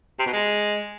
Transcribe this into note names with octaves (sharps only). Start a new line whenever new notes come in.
C3
B2
G#3